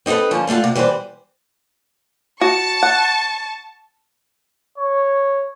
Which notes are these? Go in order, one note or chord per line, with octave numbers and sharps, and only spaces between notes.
C4 D#4 F#4 A4 B4
D3 F3 C#4 A5
G3 A3 C4 F4 F#5
C3
E3 G3 B3 B4 C5
F#4 A5 C#6
F#5
C#5